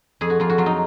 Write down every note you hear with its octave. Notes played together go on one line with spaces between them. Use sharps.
F2 G#4
F#4
F2 F4
F#4
F#3 F4
D#4